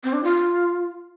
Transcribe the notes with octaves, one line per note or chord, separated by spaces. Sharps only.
C4
D4
F4